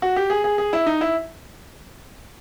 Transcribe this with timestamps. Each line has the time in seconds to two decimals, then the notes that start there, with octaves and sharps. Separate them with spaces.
0.02 F#4
0.16 G4
0.30 G#4
0.44 G#4
0.58 G#4
0.73 E4
0.86 D#4
1.01 E4